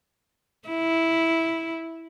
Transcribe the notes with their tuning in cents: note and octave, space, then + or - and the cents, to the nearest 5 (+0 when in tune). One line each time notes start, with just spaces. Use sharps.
E4 -5